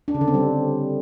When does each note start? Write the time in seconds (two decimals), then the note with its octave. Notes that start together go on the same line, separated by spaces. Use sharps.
0.08 D4
0.14 C#3
0.21 D3
0.28 C4
0.34 G3